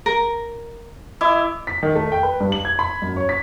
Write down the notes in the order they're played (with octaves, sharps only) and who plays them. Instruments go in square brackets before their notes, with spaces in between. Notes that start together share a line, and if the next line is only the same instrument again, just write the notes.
[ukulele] A#4
[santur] E4 [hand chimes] D#5 D6 E6
[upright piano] B6
D#3
A3
G5
B4
G2
F#7
G#6
B5
F#2
C#5
B6